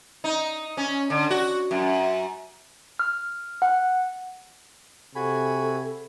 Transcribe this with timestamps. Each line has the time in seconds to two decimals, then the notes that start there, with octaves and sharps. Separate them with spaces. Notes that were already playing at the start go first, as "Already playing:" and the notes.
0.24 D#4
0.77 C#4
1.10 D3
1.31 F#4
1.71 F#2
2.99 F6
3.62 F#5
5.15 C3 F#4 A4 G#5 B5